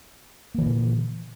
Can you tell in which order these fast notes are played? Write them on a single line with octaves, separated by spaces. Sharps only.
A#3 E3 D3 A#2